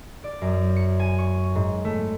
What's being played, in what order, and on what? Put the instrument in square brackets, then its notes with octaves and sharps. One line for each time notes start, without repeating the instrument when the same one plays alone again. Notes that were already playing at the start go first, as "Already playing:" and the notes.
[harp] D5
F#2
C#7
G#5
C#6
G#2
A3